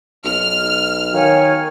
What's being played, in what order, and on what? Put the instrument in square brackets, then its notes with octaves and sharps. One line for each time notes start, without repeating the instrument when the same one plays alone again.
[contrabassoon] B1 [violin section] F6
[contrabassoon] D#3 [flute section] C#5 F5 G#5